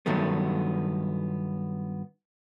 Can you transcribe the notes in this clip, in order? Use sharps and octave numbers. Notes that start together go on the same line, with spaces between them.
G2 D#3 F#3 A3 B3